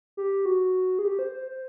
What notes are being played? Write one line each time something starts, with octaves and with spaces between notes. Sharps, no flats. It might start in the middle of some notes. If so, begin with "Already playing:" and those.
G4
F#4
G#4
G4
C5
C5
C5